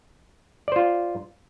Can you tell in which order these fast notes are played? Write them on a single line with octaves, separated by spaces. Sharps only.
D5 C5 F4